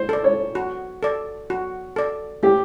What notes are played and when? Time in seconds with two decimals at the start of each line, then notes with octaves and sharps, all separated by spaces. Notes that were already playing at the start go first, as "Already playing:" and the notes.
Already playing: C5
0.09 A4 D5
0.24 C#5
0.55 F#4
1.03 A4 D5
1.50 F#4
1.96 A4 D5
2.43 A3 G4